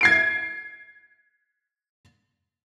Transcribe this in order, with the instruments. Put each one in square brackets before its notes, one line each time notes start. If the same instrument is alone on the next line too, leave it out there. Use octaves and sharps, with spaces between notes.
[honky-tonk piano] G#6 C7 D7